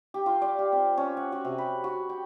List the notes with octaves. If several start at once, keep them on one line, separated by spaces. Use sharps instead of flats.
G4
F4
D5
G4
C4
C#4
F#5
F#4
C3
B5
F#4
G5